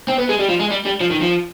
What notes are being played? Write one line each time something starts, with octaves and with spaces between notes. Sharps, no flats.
C4
B3
G#3
G3
F3
G#3
G3
G3
F3
D#3
F3